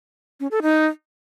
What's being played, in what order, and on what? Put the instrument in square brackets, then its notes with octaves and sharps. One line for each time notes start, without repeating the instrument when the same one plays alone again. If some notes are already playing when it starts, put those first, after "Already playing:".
[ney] C#4
A4
D#4